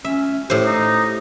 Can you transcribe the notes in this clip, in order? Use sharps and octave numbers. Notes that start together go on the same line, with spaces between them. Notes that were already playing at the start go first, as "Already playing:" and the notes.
C#4 E5
A2 G4 C5
D#4